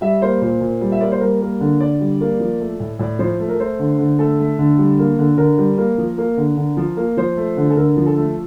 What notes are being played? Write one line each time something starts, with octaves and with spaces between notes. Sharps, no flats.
G3 E5
A#3 C5
A#2 C5
A#2
G3
E5
A#3 D5
C5
G3 A#4
A#3
D3
D3 D5
G3
A#3
F3
A3
A2
A2 D5
F3 C5
A3
A#4
A3 C5
D3
D3
A3 A4
A3
D3
G3
A#3
D3
D3 A#4
G3
A#3
F3
A#3
D3
D3
F3
A#3
F3 C5
A3
D3
A4
D3 A#4
F3
A4
A3